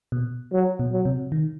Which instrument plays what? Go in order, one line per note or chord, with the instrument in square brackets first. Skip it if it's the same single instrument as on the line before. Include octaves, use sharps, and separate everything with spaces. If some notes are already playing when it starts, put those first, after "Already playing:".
[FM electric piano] B2
[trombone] F#3
[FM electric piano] B2
[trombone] F#3
[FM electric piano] C3
D#3